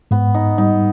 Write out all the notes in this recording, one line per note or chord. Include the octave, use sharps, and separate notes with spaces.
G#2 B3
D#4
G3 D#4